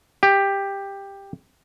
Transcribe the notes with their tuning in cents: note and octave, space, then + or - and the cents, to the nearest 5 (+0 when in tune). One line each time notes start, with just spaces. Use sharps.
G4 +10